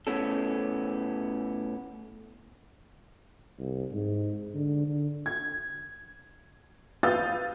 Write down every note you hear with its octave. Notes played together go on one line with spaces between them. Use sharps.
A2 B3 C#4 A4
C2
G#2
D3
D3
G#6
B4 F5 D#6 E6 G6 A6